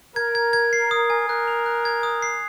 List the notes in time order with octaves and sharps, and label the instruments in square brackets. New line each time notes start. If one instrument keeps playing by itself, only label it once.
[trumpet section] A#4 [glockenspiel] G#6
[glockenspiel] G#6
G#6
C7
D#6
G#5
[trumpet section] A#4 [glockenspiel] F#6
[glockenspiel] F7
F#6
G#6
D#6
C7